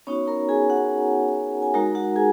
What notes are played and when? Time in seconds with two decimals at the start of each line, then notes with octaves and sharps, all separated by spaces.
0.07 B3 C#4 D#4 F#4 C#5
0.27 A#4 A#5
0.49 G#4 G#5
0.70 F#4 F#5
1.62 G#5
1.74 G#3 D#4 F#4 A#4 A#5
1.95 F#4 F#5
2.16 G#4 G#5